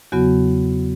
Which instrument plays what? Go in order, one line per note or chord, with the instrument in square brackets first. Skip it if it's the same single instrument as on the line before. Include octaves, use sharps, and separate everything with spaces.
[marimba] E2 C#3 F#3 B3 F#4